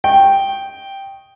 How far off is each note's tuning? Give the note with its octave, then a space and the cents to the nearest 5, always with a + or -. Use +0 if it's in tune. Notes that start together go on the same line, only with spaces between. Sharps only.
D#5 +0 G5 +0 C#6 -25